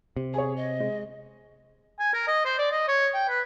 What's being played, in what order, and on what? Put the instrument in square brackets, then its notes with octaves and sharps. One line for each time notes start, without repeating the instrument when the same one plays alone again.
[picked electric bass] C3
[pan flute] G#4 [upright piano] C#5 G#5
[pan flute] D#5
[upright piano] G#3
[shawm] G#5
A#4
D#5
C5
D5
D#5
C#5
G5
B4